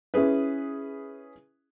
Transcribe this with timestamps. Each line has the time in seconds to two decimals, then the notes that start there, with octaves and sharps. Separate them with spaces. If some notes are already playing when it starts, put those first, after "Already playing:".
0.14 C#4 E4 G#4 B4